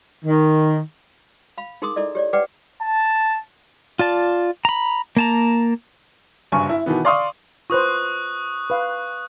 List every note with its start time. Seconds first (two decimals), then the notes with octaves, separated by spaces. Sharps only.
0.24 D#3
1.58 F5 B5
1.82 D#4 G#4 A#4 C6 D6 D#6
1.96 D#4 E4 A4 D5 D#5
2.15 G4 C#5 D5
2.33 G4 B4 D5 F#5 G5 D6
2.82 A5
3.99 F4 D5 A5
4.65 A#5 B5
5.17 A#3 A5 A#5
6.52 F#1 G2 G#5 C#6
6.69 E4
6.86 B2 D#3 E3 B3
7.05 D5 F5 C6 C#6 D#6
7.70 F4 B4 C5 C#6 D#6 F#6
8.70 B4 F5